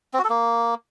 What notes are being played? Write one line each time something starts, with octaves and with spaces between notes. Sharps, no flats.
C4
F#4
A4
A#3